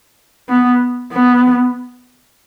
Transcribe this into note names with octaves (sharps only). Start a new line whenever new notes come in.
B3
B3